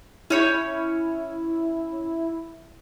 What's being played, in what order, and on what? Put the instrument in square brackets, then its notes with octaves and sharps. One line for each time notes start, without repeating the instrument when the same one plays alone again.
[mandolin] C#4 C#5 G6 [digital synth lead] E4